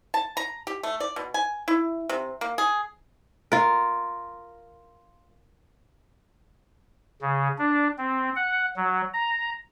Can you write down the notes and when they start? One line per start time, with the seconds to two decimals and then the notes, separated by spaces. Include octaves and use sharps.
0.14 A5
0.37 A#5
0.67 G4
0.83 A3
1.00 D5
1.16 B2
1.34 G#5
1.68 E4
2.09 C3
2.41 A#3
2.58 G#4
3.52 F4 A#4
7.21 C#3
7.59 D4
7.98 C4
8.36 F#5
8.76 F#3
9.14 A#5